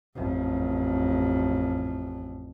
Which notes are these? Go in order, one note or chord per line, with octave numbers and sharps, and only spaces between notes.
A1 F2